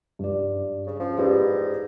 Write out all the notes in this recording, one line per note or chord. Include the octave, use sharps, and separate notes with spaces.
G2 D5
C#3
F3 C#4
G#2 G4 B4 D5